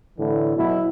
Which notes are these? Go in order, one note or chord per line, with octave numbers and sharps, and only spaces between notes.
A2 D3 E3 E4
B2 F#3 E4